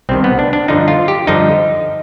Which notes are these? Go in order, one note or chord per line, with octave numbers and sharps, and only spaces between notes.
C2 C3 D#3 C4
B3
D4
D4
G2 D3 F3 D#4
F4
G4
G2 D3 F3 D#4